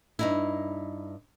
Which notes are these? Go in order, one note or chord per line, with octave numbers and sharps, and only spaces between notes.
G2 D#4 E4